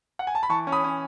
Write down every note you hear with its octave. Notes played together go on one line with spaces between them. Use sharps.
F#5
G#5
A5
B5
E3 A5 C#6
C#4
B5 D#6
C#4